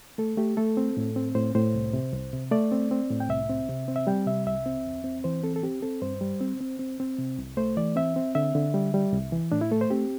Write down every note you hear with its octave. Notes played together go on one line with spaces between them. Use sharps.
A3 A4
A3 G4
A3 A4
C4
A2
C4
A2 C5
A2 C5
C2
C3
C2
C3
A3 D5
C4
C4
A2
G5
C2 E5
C4
C3
C4
E5
G3 G5
C3 E5
C2 E5
C4
E2
C4
E3 C5
C4 A4
A4
C4 G4
C4 A4
G2 C5
G3
C4
C4
C4
C4
C3
C2
A3 C5
E3 D5
C4 E5
C4
D3 E5
D3
G3
G3
C2
E3
A2 D4
E4
A3 A4
C5
C4 G4